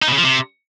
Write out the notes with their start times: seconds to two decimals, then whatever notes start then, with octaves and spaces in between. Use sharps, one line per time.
0.02 D#4
0.08 B2
0.13 C#3
0.18 F3
0.23 C3